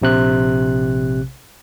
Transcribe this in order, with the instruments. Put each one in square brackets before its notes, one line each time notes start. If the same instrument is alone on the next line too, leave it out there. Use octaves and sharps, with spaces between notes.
[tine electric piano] A#1 C3 F#6